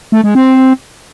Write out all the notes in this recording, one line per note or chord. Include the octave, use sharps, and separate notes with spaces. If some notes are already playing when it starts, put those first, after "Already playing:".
A3
G#3
C4